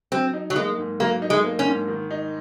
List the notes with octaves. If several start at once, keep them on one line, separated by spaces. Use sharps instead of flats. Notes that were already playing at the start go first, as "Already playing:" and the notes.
F#3 C4
D#4
F#3
G#3 A#3
G#2
F#3 A#3
D#4
G#3
A#3
C#4
G#2
D#3
D#4